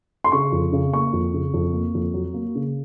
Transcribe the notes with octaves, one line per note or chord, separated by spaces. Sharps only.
C6
C#3 C#6
F2
C#3
A#3 C#6
F2
C#3
F2
A#3
F2
F#3
A#3
C#3